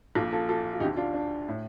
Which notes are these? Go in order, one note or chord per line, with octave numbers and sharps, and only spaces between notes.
A#1 A#2 F4 A4
F4 A4
F4 A4
F4
D2 D3 D#4 G4
D4 F4
D4
A2